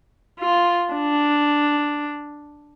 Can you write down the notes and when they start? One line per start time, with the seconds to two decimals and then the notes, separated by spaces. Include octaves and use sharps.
0.40 F4
0.94 D4